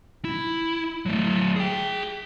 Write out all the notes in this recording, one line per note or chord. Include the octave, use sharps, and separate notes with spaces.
E4
F#3 A3
G#4 G5